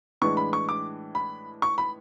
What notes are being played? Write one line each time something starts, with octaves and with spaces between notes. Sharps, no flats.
A2 E3 G#3 D4 C#6
B5
C#6
D6
B5
C#6
B5